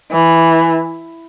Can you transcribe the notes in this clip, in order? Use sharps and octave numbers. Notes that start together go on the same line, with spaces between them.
E3